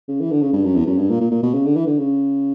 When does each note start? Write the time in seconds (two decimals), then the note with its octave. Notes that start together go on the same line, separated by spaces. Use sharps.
0.08 C#3
0.20 E3
0.31 D3
0.42 C#3
0.53 G2
0.64 F#2
0.76 E2
0.87 F#2
0.98 G2
1.10 A#2
1.20 A#2
1.31 A#2
1.43 B2
1.54 C#3
1.65 D3
1.76 E3
1.87 D3
1.99 C#3